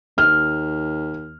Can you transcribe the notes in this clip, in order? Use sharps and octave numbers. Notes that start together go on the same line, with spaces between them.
D#2 F6